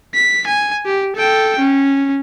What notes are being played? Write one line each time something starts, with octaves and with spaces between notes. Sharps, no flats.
B6
G#5
G4
A4 G5
C#4